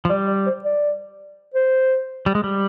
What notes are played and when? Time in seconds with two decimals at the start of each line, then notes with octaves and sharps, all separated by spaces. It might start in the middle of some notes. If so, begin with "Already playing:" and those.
0.05 F3
0.10 G3 D5
0.27 D5
0.46 C5
0.64 D5
1.55 C5
2.26 G3
2.35 G#3
2.44 G3